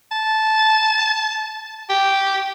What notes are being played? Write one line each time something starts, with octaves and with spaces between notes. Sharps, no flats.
A5
G4